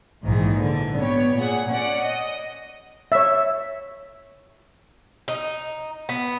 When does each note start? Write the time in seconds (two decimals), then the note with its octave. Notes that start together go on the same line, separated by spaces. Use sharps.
0.23 A#1 G#2 D#3 E3
0.62 D3
0.98 B3 G4 C#5
1.37 A#2 G#4 F#5
1.70 C#4 D5 F#5
2.02 D#5
3.12 C#5 E5
5.28 D#4
6.09 B3